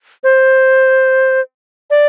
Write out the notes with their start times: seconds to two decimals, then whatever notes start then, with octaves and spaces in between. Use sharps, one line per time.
0.24 C5
1.91 D5